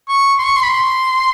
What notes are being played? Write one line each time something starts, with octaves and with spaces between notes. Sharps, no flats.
C#6
C6
C#6
C6
B5
C6